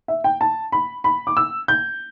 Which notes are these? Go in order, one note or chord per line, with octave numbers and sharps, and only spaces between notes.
E5
G5
A5
B5
B5
D6
E6
G6